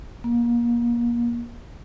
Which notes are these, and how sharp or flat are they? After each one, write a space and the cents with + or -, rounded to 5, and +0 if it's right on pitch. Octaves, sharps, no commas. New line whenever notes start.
A#3 +30